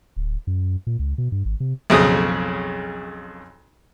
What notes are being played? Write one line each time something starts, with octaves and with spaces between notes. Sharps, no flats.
D1
F#2
A#2
C#2
B2
G2
G#1
C3
B1 F2 C#3 D#6